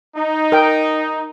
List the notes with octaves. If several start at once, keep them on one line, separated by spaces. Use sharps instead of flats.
D#4
A#4 G5